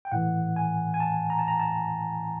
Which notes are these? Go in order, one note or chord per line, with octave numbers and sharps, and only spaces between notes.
G5
A2 E3 F#5
G#5
G#5
A5
A#5
A5
A#5
A5